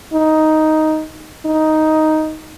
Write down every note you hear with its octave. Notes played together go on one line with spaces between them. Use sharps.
D#4
D#4